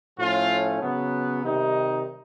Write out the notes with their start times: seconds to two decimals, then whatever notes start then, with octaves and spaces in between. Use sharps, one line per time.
0.19 A2 F3 A3 C#4 F4
0.81 C#3 F#3 B3
1.44 C3 D#3 G3 D#4